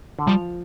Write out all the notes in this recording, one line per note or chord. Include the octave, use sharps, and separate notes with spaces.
D3
F3 G3